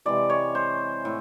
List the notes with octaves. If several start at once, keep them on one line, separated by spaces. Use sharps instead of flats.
C3 E3 G#3 D5
C#5
C5
A2